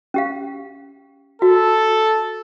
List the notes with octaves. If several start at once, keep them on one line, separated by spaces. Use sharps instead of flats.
C#4 G4 F5
F#4 A4